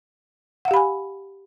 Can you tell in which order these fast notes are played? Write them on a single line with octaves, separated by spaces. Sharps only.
F#5 F5 G4 B5 G#5